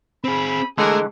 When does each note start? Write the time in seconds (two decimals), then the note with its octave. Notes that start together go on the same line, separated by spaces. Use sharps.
0.24 C4 G#4 B5
0.78 D3 E3 G#3 A3 G#4 A#4